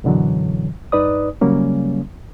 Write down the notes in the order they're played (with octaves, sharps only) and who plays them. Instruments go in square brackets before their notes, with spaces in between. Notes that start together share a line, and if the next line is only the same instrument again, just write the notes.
[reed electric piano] F#2 B2 D3 E3 F#3
G2 D#4 B4 D5 D#6
C#3 F#3 G3 A#3 C#4